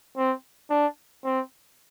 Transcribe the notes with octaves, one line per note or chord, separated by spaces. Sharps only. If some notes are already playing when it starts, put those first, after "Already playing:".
C4
D4
C4